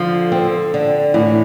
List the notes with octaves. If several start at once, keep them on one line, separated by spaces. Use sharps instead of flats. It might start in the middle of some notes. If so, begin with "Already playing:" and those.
Already playing: D3 F3
C4
D3
A2 E3